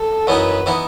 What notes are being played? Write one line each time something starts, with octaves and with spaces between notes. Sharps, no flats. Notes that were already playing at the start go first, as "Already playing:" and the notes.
Already playing: A4
F#2 E3 B3 D#4 B4
E3 B3 D#4